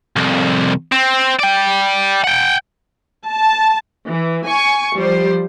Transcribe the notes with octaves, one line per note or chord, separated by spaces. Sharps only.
C2 F2
C4
D5 G5
F#5 G5
A5
E3
G#5 C#6
F3 G3 C5